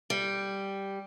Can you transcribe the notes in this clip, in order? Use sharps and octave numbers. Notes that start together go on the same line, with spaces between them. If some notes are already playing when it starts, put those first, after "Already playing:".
G3